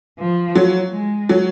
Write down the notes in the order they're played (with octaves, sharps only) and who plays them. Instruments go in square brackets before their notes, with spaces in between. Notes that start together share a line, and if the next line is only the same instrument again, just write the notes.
[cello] F3
[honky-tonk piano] F#3
[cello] G#3
[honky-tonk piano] F#3